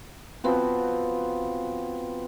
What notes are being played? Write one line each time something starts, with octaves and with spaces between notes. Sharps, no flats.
F3 B3 C4 F#4